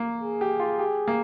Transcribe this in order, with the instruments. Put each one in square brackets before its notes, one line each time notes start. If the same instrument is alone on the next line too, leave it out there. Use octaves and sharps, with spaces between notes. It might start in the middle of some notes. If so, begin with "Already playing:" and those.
Already playing: [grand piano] A#3
[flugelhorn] G#4
[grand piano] G4
F4
G4
A#3